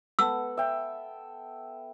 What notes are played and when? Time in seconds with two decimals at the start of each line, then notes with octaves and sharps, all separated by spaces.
0.19 B3 A4 E6
0.57 E5 G5